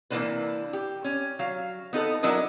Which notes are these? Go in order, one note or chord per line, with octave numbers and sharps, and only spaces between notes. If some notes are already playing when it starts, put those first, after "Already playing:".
C3 E3 G#3 A#3 D4 B4
G4
C#4
F#3 F5
B3 D#4 A4 B4
F#3 D4 E4 A#4 D#5